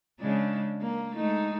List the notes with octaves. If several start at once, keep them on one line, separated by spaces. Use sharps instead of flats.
C#3 G#3 D4
A#3
G#3 A3 D#4